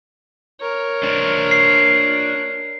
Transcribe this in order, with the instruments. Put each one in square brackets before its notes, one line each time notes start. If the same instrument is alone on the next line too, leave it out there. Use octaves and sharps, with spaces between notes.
[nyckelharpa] A#4 C#5
[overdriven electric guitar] D4 C5
[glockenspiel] C7